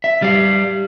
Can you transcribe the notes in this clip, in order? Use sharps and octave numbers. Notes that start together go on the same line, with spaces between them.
E5
G3 F5